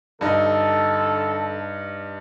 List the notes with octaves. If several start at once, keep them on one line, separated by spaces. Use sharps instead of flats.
G2 D3 D#4 A4